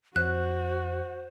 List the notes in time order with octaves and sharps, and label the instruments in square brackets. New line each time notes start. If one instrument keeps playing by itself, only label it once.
[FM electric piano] F2 [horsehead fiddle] F#4 [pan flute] C5 [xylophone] F#6